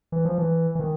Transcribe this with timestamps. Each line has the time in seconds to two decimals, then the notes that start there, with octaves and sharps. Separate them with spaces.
0.12 E3
0.25 F3
0.38 E3
0.75 E3
0.80 D#3